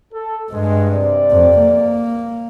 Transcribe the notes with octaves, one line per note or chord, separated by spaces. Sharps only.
A4
G2 G#3 D#5
C3 D5
F2
A#3